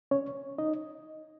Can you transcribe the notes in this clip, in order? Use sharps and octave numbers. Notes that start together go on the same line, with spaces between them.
C#4 C#5
D#4 D#5